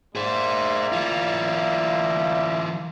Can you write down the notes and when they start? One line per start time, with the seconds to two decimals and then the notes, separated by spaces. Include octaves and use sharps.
0.15 G3 A#3 G#4 C5 E5
0.92 E3 F4